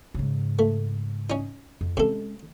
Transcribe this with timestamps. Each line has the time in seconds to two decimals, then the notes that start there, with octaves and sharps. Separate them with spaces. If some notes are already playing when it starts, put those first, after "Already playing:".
0.14 G#2 C#3
0.59 A3
1.30 C#4 D#4
1.81 F2
1.97 C3 G#3 C#4 A4